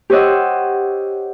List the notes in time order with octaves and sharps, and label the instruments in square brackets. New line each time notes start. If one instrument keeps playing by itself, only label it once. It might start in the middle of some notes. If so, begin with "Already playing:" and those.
[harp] G4 C5 C#5 D#5 F#5 E6